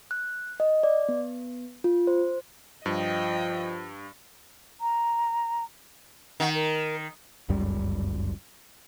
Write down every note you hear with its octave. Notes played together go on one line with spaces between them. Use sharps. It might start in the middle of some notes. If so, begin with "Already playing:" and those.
F#6
D#5
D5
B3
F4
C5
G2 F3 D#5 G5
A#5
D#3 F#5
A#4
G1 C#2 F#2 G3